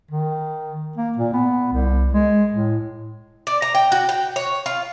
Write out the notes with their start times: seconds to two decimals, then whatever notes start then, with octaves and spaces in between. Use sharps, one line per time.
0.11 D#3
0.97 A#3
1.18 A#2
1.34 B3
1.73 C2
2.13 G#3
2.53 A2
3.47 D5
3.62 A#5
3.75 G5
3.92 F#4
4.09 G5
4.36 C#5
4.66 F4